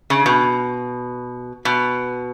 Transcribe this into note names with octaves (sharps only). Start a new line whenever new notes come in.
C#3
B2
B2